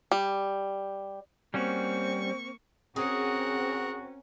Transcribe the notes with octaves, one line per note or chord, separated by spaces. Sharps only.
G3
G3 A#3 C4 C#4 F#4 C#6
C4 C#4 F#4 G#4 A#4 F#5